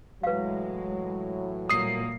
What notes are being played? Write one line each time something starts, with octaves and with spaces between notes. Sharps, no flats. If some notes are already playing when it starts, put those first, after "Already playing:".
A2 E3 F#3 G#3 B4 F5
A#2 G3 A#3 D#6 C7